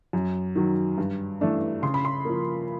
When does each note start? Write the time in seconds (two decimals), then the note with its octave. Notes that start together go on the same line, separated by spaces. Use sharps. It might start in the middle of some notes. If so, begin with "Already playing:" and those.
0.13 F#2
0.55 D#3 F#3
0.98 G2
1.41 E3 A3 D4
1.82 C#3 C6
1.94 B5
2.05 C6
2.25 F3 A#3